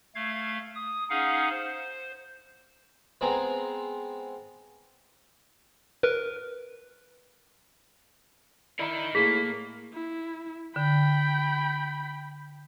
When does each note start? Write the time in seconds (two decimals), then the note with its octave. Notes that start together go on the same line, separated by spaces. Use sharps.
0.15 A3 F5 G#6
0.75 D#6
1.10 C#4 D#4 G#4 F5 F#5
1.50 C5
3.21 G#3 B3 C4 G#4 A#5
6.03 A#4 B4
8.79 D#4 E4 A#4 D5 A#5
9.15 A2 A#3 G#4 B6
9.94 E4
10.76 D3 G5 B5